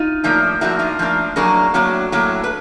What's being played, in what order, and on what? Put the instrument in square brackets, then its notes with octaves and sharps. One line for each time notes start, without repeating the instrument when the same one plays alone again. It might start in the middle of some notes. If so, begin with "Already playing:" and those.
Already playing: [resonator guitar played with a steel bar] D#4 F4
A2 F3 A#3 D4
A2 F3 A#3 D4 E4 F#4
D#4 F4
A2 F3 A#3 D4
A2 F#3 A#3 D4 F#4 G#4
A2 F#3 A#3 D4
A2 F#3 A#3 D4
B4